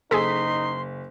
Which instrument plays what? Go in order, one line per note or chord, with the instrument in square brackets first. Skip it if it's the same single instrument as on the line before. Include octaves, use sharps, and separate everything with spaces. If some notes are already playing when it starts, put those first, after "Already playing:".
[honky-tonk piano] F#1 B6 [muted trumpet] D#4 [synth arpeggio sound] G#4 A4 [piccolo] C6